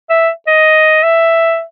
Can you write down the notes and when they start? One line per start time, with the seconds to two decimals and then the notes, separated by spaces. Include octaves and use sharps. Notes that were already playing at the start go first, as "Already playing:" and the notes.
0.10 E5
0.47 D#5
1.03 E5